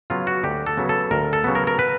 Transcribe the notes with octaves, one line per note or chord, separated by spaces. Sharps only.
C#3 F#3 B3 F4
F#4
D2 G4
A4
C#3 F#3 B3
A4
D2 A#4
A4
C#3 F#3 B3
A#4
A#4
B4